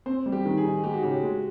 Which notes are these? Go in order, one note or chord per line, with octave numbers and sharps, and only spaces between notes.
C4 C5
G3
G4
D#3
G#4
D#4
G#3 G4
F#4
C#3 G4
G#3